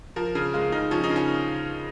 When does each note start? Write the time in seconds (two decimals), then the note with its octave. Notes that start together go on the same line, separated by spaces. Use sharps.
0.16 F3 A#4
0.35 C#3
0.54 G#3 F4
0.72 C#3 D#4
0.91 F3 C#4
1.04 D#4
1.10 C#3
1.16 C#4